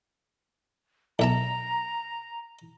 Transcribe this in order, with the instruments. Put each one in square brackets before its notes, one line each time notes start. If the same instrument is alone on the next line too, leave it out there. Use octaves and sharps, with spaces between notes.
[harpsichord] B1 E5 A5 [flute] A#5